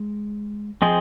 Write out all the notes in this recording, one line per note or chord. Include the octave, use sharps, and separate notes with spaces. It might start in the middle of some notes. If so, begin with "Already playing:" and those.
Already playing: G#3
F3 C4 G#4 D#5